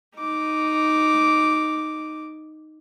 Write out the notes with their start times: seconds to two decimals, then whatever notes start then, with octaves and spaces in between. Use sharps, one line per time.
0.16 D#4 D6